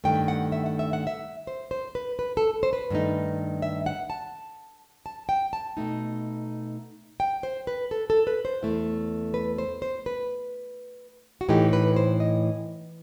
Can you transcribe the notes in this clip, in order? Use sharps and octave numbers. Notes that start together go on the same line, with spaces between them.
G2 D#3 A3 G5
F#5
E5
F#5
E5
F#5
E5
C5
C5
B4
B4
A4
C5
B4
G2 D#3 A3 D#4
E5
F#5
A5
A5
G5
A5
B2 A3 D#4
G5
C5
B4
A4
A4
B4
C5
E2 B2 A3 E4
B4
C5
C5
B4
F#4
A2 E3 A3 D#4 G4
B4
C5
D#5